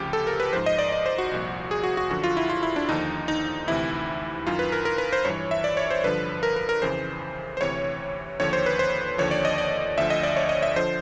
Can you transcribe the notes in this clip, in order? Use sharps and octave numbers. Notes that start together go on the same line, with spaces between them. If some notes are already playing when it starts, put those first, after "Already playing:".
Already playing: D2 C#3 F3 G4
A4
A#4
B4
G#2 F3 C5
D#5
D5
D5
C5
F#4
C2 A#2 F3
G#4
F#4
F#4
F#2 D3 F3 F#4
F4
E4
F4
E4
D4
D#2 D3 F3 D#4
D#4
D2 C3 E3 E4
F#2 D#3 F4
B4
A#4
A#4
B4
C5
G2 E3 C#5
E5
D5
C#5
C5
G2 D3 F3 B4
A#4
A#4
A#4
F2 C#3 E3 C5
C5
D2 C3 E3 C#5
D#2 D3 F3 C#5
C5
B4
C5
D#2 D3 F3 C#5
D5
D#5
D5
D2 D3 F3 E5
D#5
D5
C#5
D#5
E5
D3 F3 C5